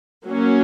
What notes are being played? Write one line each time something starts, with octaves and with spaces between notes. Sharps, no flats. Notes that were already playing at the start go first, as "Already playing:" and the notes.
F#3 A#3 C#4